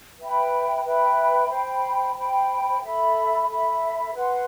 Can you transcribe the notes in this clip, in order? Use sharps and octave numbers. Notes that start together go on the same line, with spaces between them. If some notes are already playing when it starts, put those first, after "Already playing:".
B4 E5 G5 B5
B4 E5 G5 B5
C5 G5 B5
C5 G5 B5
A4 E5 B5
A4 E5 B5
B4 F#5 C6